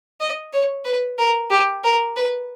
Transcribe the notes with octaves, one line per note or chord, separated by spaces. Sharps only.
D#5
C#5
B4
A#4
G4
A#4
B4